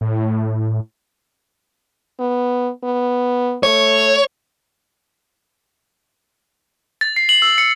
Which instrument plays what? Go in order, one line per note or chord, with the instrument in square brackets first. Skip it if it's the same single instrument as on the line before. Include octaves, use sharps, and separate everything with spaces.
[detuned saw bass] A2
[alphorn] B3
B3
[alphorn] A3 [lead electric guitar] C#5
[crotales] A6
C7
F#7
E6
C#7